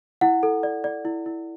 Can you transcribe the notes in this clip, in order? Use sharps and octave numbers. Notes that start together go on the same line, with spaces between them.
E4 F#5
A4
D5
D5
E4
E4